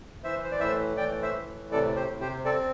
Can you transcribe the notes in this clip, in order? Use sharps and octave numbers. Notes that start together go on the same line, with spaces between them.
E3 C5 E5
C5
D5
A2 C5 E5
E3 D5 G5
C5 E5
A2
C3 A4 D5
G4 C5
C3
G4 C5
C4 A4 D5